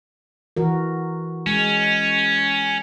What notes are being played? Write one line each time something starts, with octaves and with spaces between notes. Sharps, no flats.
E3 F#4 A#4
G#3 C#4